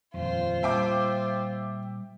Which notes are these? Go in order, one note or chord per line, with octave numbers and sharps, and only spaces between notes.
D#1 F2 F4 C5
A#2 G3 E5 G5 D6